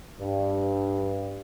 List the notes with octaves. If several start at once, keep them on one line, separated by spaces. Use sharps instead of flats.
G2